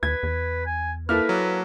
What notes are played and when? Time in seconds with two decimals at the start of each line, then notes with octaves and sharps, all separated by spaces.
0.03 D#2 B4 G#6
0.23 E2
0.66 G#5
1.09 A#3 E4 A4 B4 F6
1.29 F#3